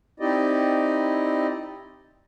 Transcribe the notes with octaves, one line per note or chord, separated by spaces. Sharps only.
C4 D#4 E4 G4 D5 D#5